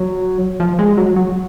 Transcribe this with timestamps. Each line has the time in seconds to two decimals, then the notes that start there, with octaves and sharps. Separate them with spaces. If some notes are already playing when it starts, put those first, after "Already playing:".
Already playing: F#3
0.60 F3
0.79 G#3
0.97 F#3
1.16 F#3